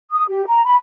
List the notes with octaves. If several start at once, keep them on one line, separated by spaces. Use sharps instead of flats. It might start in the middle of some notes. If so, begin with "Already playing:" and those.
D#6
G4
A#5
B5